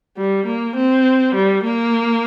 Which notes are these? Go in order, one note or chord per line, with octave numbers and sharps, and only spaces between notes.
G3
A#3
C4
G3
A#3